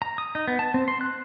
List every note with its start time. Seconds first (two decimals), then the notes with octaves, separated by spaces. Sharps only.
0.02 A#5
0.18 D#6
0.35 D#4
0.48 B3
0.59 A5
0.74 C4
0.88 C6
1.01 F#6